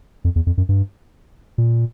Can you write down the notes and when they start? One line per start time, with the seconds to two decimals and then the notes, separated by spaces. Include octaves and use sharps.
0.24 F2
0.36 E2
0.47 F2
0.58 F#2
0.69 G2
1.58 A#2